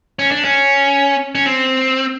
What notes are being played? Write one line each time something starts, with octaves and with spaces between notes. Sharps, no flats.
C#4
D4
C#4
C#4
C4